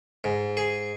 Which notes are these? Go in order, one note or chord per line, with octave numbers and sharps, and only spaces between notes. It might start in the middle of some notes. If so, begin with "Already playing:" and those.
G#2
G#4